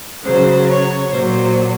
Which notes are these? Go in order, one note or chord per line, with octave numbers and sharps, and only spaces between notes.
C#3 F#3 C5
C#5
A#2 F#3 C5